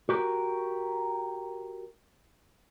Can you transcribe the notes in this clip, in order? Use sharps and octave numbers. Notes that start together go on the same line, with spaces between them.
F#4 G4 A#4